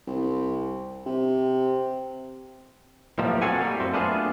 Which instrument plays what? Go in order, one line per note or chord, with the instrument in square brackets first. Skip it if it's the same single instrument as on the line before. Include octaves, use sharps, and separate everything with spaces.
[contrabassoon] C2
C3
[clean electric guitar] B1 F2 A2 F3 G3 A#3
C4 F#4 A4 F5 F#5 G#5
A2 G3 A#3
F#2 C4
A3 B3 D4 F4 G#4